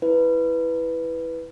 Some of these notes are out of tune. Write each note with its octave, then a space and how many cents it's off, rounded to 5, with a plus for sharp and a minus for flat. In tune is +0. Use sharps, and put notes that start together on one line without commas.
E4 +0 B4 +0